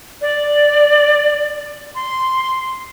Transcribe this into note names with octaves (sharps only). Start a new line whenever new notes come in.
D5
C6